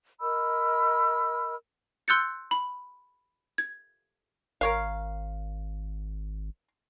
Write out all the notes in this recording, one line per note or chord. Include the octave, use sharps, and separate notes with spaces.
A#4 D#5 B5 E6
C6 E6 F#6 G6 A6 C#7
B5
G#6
G#1 A#4 C#5 F5